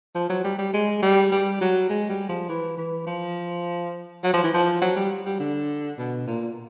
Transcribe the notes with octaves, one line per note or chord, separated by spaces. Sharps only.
F3
F#3
G3
G3
G#3
G3
G3
F#3
G#3
G3
F3
E3
E3
F3
F#3
F3
E3
F3
F#3
G3
G3
D3
B2
A#2